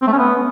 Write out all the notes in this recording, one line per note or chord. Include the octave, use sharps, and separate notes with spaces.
C4
A3
C#4
B3